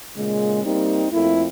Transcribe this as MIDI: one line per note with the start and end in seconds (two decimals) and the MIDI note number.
0.16 0.62 46
0.16 0.62 49
0.16 0.62 56
0.64 1.07 55
0.64 1.07 58
0.64 1.07 60
0.64 1.07 63
1.12 1.46 41
1.12 1.46 57
1.12 1.46 58
1.12 1.46 64